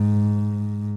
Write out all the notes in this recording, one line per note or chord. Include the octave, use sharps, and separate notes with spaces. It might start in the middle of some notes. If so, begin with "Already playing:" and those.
Already playing: G#2